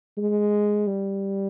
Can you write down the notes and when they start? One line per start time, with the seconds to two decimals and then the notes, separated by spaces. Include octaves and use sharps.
0.18 G#3
0.87 G3